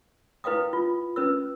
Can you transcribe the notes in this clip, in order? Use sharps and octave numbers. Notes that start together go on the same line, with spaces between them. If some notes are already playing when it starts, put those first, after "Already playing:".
E4 B4 F5 G5 D#6
F4
C#4 B4 E6